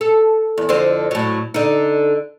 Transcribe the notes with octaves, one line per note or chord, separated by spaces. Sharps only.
A4
E2
F2 D3 C5
A2 F#3
D3 D#4